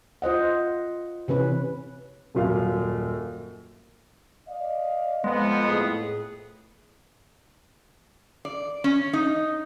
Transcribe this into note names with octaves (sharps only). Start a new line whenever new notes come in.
F4 C5 D#5 F#5
C3 E3 C#4 B4
D#1 F#2 F5
D5 D#5 F5
F2 G#3 B3
A2 G#4
D5
C#4
D#4